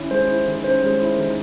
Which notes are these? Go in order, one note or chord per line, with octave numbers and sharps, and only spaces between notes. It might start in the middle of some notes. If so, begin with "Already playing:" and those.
Already playing: D#3 C#4 E4
G#3 C5
E4
D#3
C#4 C5
G#3
E4
D#3